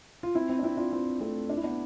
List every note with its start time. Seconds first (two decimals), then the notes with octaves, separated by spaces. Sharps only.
0.23 F4
0.35 C4 E4
0.49 C4 E4
0.59 D4
0.63 C4 E4
0.77 D4 F4
0.92 C4 E4
1.20 A3 C4
1.49 D4
1.57 E4
1.64 B3 D4